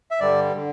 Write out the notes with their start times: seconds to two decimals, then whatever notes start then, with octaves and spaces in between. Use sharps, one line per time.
0.11 E5
0.20 G2 D3 G3 D5
0.56 D3